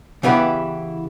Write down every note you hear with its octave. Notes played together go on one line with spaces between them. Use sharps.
C#3 E3 B3 E4 G4 F#5